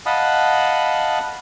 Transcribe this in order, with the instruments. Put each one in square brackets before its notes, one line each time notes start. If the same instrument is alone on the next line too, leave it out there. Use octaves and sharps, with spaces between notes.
[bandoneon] D#5 F5 F#5 A5 B5 D#6